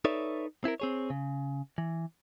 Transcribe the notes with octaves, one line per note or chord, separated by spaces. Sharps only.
D#4 A4 B4 C#5 D5 E5
C4 E4 G#4 A#4
C4 G#4 C#5
C#3
E3